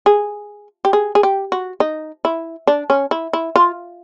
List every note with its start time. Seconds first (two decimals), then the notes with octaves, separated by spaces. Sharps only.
0.06 G#4
0.85 G4
0.93 G#4
1.15 G#4
1.23 G4
1.52 F#4
1.80 D#4
2.25 E4
2.67 D4
2.90 C#4
3.11 E4
3.33 E4
3.56 F4